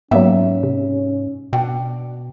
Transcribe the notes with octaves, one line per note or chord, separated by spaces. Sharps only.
G#2 F#3 A#3 B3 C#4 E5
C3
B2 D4 F#5 G5